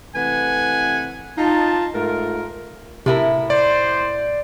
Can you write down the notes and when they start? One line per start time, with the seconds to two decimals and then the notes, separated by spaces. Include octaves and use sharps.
0.16 C3 E3 A3 B4 F#5 G#5
1.38 D#4 F4 A5
1.95 G#2 A3 F4 A#4
3.06 A2 C3 E4 A#4
3.50 C5 D5